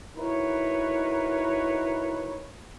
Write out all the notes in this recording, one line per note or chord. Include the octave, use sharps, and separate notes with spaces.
D#4 E4 F#4 A#4 B4 C#5